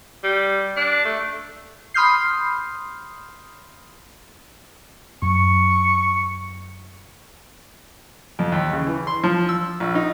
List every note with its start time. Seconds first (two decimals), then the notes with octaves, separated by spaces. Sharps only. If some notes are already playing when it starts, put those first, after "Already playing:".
0.24 G3
0.76 D4
1.05 A3
1.94 B5 C6 D#6 F6 G6 C7
5.22 F#2 C#6
8.39 F2
8.52 D#2
8.73 C#3
8.86 E3
9.07 C6
9.24 F3
9.49 E6
9.80 A#1
9.95 D#4